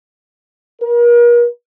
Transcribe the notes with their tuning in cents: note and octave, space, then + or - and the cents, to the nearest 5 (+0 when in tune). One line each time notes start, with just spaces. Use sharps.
A#4 +40